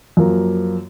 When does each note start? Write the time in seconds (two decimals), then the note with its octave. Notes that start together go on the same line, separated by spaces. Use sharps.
0.17 F#2 F3 A#3